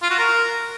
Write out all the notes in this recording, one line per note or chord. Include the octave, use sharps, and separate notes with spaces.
F4
F#4
A#4